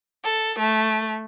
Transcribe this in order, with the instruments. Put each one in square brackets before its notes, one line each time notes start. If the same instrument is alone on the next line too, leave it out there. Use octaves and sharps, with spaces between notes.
[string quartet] A4
A3